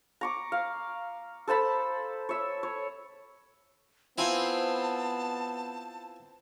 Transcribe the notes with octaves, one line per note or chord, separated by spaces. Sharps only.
A#5 C#6 D6
F5
A4 C5 A5 B5
C#5 E5
C#5
B3 C4 E4 F4 G#5 A5